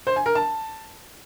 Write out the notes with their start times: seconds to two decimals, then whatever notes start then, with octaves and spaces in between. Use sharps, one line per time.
0.07 C5
0.16 G#5
0.26 A#4
0.35 A5